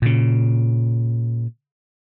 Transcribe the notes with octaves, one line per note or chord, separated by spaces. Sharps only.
A#2 C#3